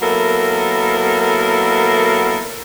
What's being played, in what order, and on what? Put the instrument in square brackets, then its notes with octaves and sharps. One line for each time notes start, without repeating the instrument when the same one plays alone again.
[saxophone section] F#3 A#3 B3 E4 A4 A#4